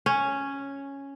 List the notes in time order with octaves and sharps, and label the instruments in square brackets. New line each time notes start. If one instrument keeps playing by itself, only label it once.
[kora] C#4